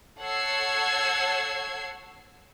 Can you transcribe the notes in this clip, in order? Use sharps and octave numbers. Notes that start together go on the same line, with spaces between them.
A4 C#5 F#5 E6 G#6 C7